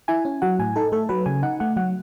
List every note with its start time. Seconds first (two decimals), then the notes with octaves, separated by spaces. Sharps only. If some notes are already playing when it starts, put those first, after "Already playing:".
0.08 E4 G#5
0.25 C#4
0.42 F#3 F#5
0.59 A2 G#5
0.76 D#4 A4
0.92 A3 A4
1.09 F#3 B4
1.26 C#3 G#5
1.43 D#4 F#5
1.60 A3 F#5
1.77 F#3 F#5